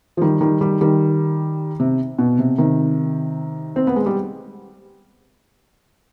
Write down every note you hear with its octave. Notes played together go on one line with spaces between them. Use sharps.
F3
D#3 G3
D#3 G3
D#3 G3
D#3 G3
C3
B2
C3
C3 D#3
C4
B3
G#3
G3